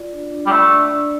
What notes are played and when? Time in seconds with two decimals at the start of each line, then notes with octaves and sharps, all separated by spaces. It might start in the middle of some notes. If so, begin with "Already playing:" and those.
Already playing: F4 D5
0.12 D4
0.32 D4
0.46 G3
0.52 A3 D5
0.71 D4
0.91 D4